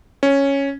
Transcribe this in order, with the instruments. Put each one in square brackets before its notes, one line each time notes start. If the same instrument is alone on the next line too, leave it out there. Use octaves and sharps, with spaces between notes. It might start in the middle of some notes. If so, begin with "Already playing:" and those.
[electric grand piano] C#4